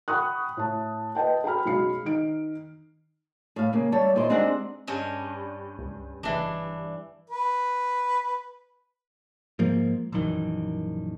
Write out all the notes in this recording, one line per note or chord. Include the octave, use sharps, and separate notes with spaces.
F#5 G5 B5 C#6 D#6 F#6
A2 A5
B4 D#5 G5 A5
A4 G5 A#5 B5 F6
B1 G#3 F#4 B5 C7 C#7
D#3 D#4 D7
A2 F5
C#3 A#3
G3 C#5 E5 A5
A#2 D#3 E4 C5
G#3 C4 D4 D#4 G4 F#5
G2 C#4 C#5
C#2
F#1 E3 D4
B4
G#2 F3 A#3
A#1 F#2 D#3 E3